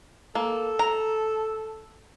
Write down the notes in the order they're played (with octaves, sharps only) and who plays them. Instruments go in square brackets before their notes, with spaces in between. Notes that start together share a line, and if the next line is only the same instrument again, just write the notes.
[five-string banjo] A#3 [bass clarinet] A4
[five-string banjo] A#5